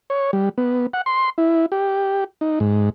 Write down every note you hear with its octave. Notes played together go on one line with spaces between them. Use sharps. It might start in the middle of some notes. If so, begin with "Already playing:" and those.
C#5
G3
B3
F#5
C6
E4
G4
D#4
G#2